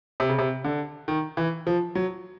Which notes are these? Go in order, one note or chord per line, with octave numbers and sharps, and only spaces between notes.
C3
C#3
C3
D3
D#3
E3
F3
F#3